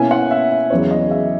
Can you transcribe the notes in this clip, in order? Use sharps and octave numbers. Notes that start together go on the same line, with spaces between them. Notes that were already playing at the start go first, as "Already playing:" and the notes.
Already playing: B2 A#3 C#4 E4 G#5
F#5
E5
E5
E2 C#3 F#3 B3 E4 C#5
D#5
E5